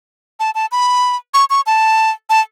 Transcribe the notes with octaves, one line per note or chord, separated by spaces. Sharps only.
A5
A5
B5
C#6
C#6
A5
A5